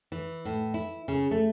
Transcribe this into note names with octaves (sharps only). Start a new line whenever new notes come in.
E3
A2
E4
C#3
A3